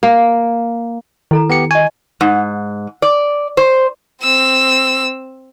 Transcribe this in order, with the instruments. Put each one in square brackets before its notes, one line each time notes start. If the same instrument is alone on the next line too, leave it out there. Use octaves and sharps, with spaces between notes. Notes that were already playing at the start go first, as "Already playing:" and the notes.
[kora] A#3
[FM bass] D#3 [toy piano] E4 A4 A#5
[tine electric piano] B3 G4 C#7
[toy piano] D#5 C#6 [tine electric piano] G#5
[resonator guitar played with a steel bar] G#2
D5
C5
[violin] C4 E6